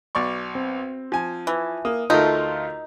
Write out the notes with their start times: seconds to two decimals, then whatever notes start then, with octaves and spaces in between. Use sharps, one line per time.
0.15 B1 D5 C#6
0.55 C4
1.12 F3 G#5
1.47 E3
1.85 A#3 D#6
2.10 D2 A3 D#4 F4 A4 A#4